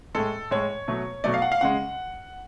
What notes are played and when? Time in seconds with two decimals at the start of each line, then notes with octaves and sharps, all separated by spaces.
0.15 A2 G#3 A4
0.51 A2 G#3 C#5
0.88 B2 F#3 A3
1.24 B2 F#3 A3 D5
1.34 F5
1.42 F#5
1.52 F5
1.61 C#3 G#3 F#5